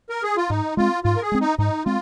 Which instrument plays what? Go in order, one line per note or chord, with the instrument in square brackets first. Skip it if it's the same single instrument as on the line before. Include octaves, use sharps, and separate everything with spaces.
[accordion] A#4
G#4
F4
[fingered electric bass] G#2 [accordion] D#4
[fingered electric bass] G#3 C4 [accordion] F4
[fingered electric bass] G#2 [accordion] F4
[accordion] A#4
G#4
[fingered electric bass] G#3 C4
[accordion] D#4
[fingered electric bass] G#2 [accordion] D#4
[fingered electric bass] G#3 C4 [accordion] F4